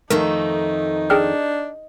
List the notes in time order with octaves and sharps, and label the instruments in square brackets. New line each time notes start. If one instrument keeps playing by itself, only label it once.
[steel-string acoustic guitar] F2 D#3 A3 [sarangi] D#4 [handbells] A#4
[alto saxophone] D4 [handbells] G#4 G5 F6